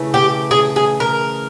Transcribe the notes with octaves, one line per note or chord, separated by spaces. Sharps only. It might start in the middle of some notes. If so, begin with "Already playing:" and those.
Already playing: C#3 E3 A3
G4
G#4
G#4
A#4